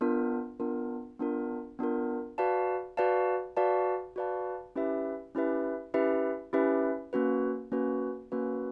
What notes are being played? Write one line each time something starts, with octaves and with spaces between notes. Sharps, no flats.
B3 D4 F4 A#4
B3 D4 F4 A#4
B3 D4 F4 A#4
B3 D4 F4 A#4
F#4 B4 D5 F5 A5
F#4 B4 D5 F5 A5
F#4 B4 D5 F5 A5
F#4 B4 D5 F5 A5
C#4 E4 G4 B4 E5
C#4 E4 G4 B4 E5
C#4 E4 G4 B4 E5
C#4 E4 G4 B4 E5
A#3 C#4 F#4 B4
A#3 C#4 F#4 B4
A#3 C#4 F#4 B4